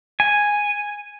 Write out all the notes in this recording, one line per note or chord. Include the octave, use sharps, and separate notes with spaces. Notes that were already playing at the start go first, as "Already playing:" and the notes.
G#5